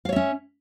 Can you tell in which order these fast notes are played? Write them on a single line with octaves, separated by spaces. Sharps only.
F5 C#5 E5 C#4